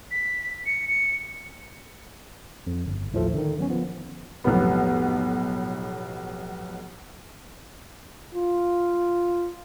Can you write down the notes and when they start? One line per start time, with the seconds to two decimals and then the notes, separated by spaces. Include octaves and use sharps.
0.11 B6
0.66 C#7
0.88 C#7
2.67 F2
2.86 G1
3.12 A1 D#2 A2 D#3 F3 A3
3.34 D3 D#3
3.58 F#3 B3 C#4
3.70 F3 B3
4.44 B1 F2 A2 G3 B3
8.35 F4